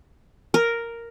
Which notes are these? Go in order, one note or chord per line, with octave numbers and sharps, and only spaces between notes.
A#4